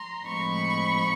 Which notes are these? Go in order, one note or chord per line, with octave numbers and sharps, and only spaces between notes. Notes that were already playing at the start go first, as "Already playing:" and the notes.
Already playing: A#5 C6
A2 F3 G#3 C4 D#4 B5 C#6